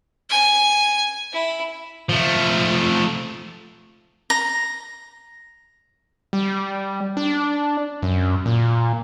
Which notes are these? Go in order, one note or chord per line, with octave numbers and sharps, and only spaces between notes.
G#5
E4
F3 A3
A#5
G3
D4
F#2
A#2